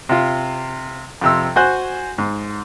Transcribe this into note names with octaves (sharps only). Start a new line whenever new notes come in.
C3 F4
F2 C3 E6
F#4 C5 G#5 F#6
G#2